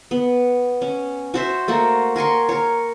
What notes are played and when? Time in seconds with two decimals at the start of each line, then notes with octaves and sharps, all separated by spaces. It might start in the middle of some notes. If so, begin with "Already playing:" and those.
0.11 B3
0.82 C#4
1.34 F#4 C5 E5
1.68 A3 A#3 F#4
2.16 A#4 G#5 C6 C#6
2.49 A#4 C#5